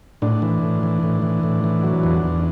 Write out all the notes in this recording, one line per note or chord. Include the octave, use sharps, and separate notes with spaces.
A2 D4
E3
A2
E3
A2
E3
A2
E3
F#3
E2
E2